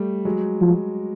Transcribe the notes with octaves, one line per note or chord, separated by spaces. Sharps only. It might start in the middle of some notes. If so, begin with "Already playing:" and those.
Already playing: G3 A3
F#3 G#3
F3